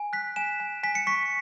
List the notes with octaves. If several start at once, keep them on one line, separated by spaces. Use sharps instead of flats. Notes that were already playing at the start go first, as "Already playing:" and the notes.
Already playing: G#5
F#6 B6
G#5 E7
G#5
G#5 B6
C#7
C#6 B6